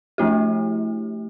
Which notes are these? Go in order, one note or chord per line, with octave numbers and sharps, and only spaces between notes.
F3 A3 E4 G4